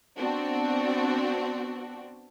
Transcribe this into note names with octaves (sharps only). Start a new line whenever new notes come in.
B3 C4 D4 F#4